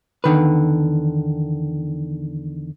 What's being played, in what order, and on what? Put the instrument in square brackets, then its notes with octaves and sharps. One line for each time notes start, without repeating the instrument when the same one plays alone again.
[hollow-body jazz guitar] E2 D3 D#3 B4